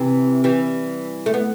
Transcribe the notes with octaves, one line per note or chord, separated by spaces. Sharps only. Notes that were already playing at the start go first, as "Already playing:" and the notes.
Already playing: C3 E3
E3 G3
A3
B3